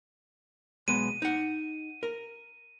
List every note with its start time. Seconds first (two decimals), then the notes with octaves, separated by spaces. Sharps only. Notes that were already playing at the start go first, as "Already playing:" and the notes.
0.88 B1 G#3 B3 D#7
1.22 D#4 F#5
2.03 A#4